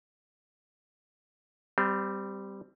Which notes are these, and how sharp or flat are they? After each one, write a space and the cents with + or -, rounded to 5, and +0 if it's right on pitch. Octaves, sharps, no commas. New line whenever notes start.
G3 +0 C4 -25